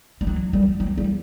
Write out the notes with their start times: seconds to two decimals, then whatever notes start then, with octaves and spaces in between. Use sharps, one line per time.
0.21 G3
0.27 F#3
0.53 G3
0.80 F#3
0.98 G3